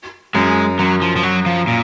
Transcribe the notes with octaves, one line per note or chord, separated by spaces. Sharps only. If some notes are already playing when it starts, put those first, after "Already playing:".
F#2 G#3
F#2 F#3
F3
F3
F#3
F3
A#2